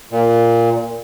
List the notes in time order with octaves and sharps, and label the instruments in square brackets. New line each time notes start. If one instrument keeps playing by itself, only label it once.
[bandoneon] A#2